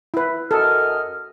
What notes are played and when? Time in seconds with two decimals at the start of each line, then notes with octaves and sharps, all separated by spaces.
0.14 E4 B4
0.51 F#2 A4 D#5 F6